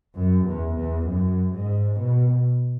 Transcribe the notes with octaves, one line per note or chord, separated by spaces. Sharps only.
F#2
E2
E2
F#2
G#2
B2